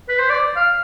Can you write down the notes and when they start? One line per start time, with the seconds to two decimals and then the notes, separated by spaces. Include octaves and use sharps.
0.09 B4
0.19 C5
0.29 D5
0.56 F5